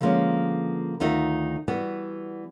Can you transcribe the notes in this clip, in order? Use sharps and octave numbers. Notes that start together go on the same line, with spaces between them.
D3 F3 G#3 A#3 B3 C#4
D2 D#3 D#4 F4 E5 F#5
E3 G3 B3 F#4